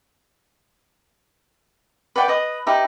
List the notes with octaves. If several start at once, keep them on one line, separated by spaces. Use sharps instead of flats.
B4 D5 F#5 G5
B4 D#5 D#6
D#4 G4 B4 E5